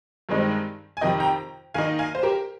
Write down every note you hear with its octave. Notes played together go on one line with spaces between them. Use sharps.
G2 D#3 G#3 C4 D#4
G#5
F2 C3 D#3 D#5 G5
G5 A#5
D#3 A#3 D#4 F5 G#5
F5 G#5
C5
G4 A#4